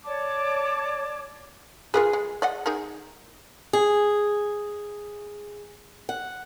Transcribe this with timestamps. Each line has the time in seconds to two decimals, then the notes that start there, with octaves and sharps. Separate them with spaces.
0.04 C#5 D5 A5 D6
1.94 F4 G#4 A#4 B4
2.13 G#3
2.42 D5 D#5 F#5
2.66 D#4 G#4 A#4
3.73 G#4
6.09 F#5